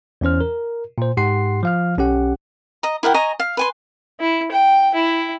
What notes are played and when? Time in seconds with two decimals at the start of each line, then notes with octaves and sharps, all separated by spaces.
0.21 E2 E3 C#4 C5 F6
0.41 A#4
0.98 A#2 C5
1.17 G#2 G4 F#5 C6 C7
1.63 F3 F5 F6
1.98 B1 C#4 G4 F#5
2.83 D#5 A#5
3.03 E4 A#4 F#5 G5
3.14 D#5 G#5 A#5 C#6
3.40 F5
3.57 B4 G#5 C6
4.20 E4
4.51 G5
4.94 E4